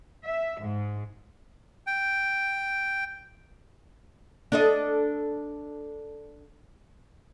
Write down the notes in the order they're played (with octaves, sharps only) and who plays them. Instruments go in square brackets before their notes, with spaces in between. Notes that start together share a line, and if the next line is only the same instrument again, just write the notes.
[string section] E5
G#2
[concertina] G5
[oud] D4 A4 D#5